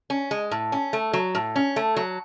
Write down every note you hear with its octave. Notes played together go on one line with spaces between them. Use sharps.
C#4
G#3
A2
C#4
A3
F#3
A2
C#4
A3
F#3